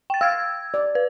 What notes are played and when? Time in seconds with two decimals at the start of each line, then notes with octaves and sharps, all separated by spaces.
0.10 G5 A6
0.21 F5 E6 G#6
0.74 D5
0.95 B4